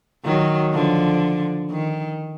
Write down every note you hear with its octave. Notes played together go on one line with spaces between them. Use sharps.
D#3 F#3
D3 F3
D#3